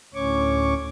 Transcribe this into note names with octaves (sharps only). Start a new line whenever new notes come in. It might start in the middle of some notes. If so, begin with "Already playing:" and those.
D2 A2 C#4 C#5 C#6 D6